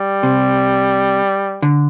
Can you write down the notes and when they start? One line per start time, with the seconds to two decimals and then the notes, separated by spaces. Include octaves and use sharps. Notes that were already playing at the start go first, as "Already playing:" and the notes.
Already playing: G3
0.23 C3
1.62 D3